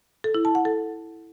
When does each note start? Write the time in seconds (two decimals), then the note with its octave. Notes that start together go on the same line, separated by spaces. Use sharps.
0.24 A4
0.35 E4
0.45 A5
0.55 F#5
0.65 A4